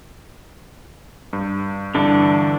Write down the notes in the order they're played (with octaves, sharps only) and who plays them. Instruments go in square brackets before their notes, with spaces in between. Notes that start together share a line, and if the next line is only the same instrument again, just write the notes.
[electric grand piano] G2
[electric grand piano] G2 [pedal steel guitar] D3 E3 D4